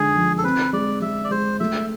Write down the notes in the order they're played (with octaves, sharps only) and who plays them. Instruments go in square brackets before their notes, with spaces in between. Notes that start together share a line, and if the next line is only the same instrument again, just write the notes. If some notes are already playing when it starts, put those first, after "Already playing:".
Already playing: [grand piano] D3 G#3 [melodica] G#4
[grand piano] F3
[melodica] A4
[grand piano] C4 [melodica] B4
[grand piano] G#3 [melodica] D5
[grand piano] G#3 [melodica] E5
[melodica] D5
[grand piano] G#3 [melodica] C5
[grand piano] A3 [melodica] E5